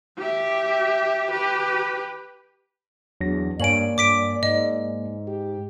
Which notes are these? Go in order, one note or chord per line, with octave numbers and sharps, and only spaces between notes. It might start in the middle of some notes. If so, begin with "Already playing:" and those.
G4 E5
G4 B4
E2 F#3 D4 A#6
G2 A#3 C#5 D5 G#5 D7 F#7
G2 D6 B6 D7
G#2 D#5
G4